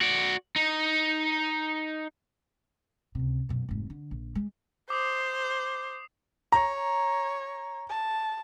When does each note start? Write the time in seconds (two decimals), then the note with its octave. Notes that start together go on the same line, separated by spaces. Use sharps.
0.01 F#4 D5
0.56 D#4
3.15 C#2 C3
3.49 F#2 B2
3.69 F1 G#2
3.90 D3
4.11 A#1
4.35 G#3
4.90 C5 D6 D#6 C7
6.52 C#5 A#5
7.89 A5